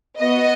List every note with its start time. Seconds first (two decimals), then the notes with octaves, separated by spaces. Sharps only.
0.18 B3 F#4 D#5